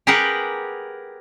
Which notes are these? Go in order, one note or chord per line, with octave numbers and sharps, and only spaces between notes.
G4 G#4 A#4 B4 F#5 G5